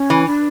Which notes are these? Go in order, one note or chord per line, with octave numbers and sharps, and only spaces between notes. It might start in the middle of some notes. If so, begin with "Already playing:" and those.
Already playing: C#4
E3
D4